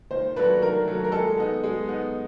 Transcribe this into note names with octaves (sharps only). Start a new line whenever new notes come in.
D#3 C5
F#3 A3 D4 B4
D#3 A#4
F#3 A3 D4
A#4
G#3 A4
B3 D#4
G#3
B3 D#4